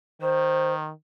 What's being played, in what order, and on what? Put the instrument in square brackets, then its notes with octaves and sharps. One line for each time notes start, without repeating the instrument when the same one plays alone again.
[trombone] D#3 [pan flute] C5